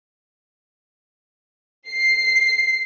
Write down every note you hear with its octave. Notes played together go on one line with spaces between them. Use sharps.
C7